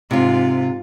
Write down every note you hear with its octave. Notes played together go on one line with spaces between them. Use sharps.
G#2 C3 C4 F4